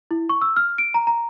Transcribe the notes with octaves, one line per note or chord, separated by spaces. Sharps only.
E4
C#6
E6
F6
D7
A#5
A#5